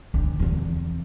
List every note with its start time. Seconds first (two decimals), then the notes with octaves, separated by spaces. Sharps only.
0.14 D2
0.39 E2 C3